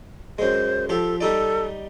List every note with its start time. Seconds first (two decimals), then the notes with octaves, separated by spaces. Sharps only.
0.39 F#2 G#3 C5
0.89 F3 G4 A4
1.21 G3 D#4 A4 D5